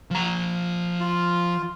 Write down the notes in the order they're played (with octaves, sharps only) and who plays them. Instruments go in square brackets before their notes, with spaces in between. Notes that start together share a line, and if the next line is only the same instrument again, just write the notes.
[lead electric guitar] F3 A#5
[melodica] F4